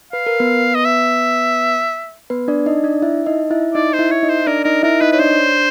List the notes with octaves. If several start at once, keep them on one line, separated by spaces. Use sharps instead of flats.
B4 F5
A#4
B3 B4
D#5
E5
B3 B4
D4 D5
D#4 D#5
D4 D5
E4 E5
D#4 D#5
E4 E5
D#4 D5 D#5
C5
E4 E5
C#5 E5
D#4 D#5
C5
D4 A#4 D5
D#4 A#4 D#5
E4 A#4 E5
D#4 B4 D#5
B4 C#5
D4 C5 D5